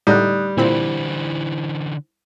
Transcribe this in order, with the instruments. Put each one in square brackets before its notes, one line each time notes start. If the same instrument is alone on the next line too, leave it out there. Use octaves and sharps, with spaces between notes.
[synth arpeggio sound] A2 D3 D#4 [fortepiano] G3 [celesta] D#6 F#6
[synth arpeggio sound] A#2 C4 B5 [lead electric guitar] D3 E3 [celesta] E4 C5